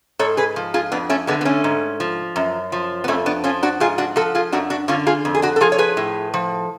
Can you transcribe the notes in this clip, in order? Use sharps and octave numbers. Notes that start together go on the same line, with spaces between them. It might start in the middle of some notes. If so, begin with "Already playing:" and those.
G#2 A4 C#5
G#4 B4
F3
F4 G#4
F2 B3 D4
A3 C#4
D3 G#3 B3
B3
A3 C#4
G#2
F3
F#2
F3
B3
F2 A3 C#4
B3 D4
F3 C#4 F4
D4 F#4
G#2 F4 G#4
D4 F#4
F3 F#4 A4
F4 G#4
F#2 D4 F#4
D4 F#4
D3 C#4 F4
F4 G#4
F2
G#4
D4 F#4
A4
F3 F4 G#4
C#5
G#4 B4
A2
F3